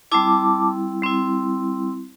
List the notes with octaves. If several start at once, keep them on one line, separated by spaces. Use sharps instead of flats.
G3 C4 E4 A5 D6
G3 C4 E4